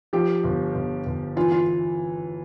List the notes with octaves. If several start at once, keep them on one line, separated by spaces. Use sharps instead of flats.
F3 G4
G1
G1
G1
E3 F4
F4